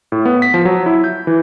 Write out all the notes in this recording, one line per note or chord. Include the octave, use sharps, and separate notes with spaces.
A2
B3
B6
F3
F#3
E4
G6
E3